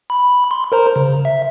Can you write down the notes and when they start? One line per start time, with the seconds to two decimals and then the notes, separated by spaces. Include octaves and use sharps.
0.10 B5
0.51 C6
0.72 A#4 C5 A#5
0.96 C#3
1.25 E5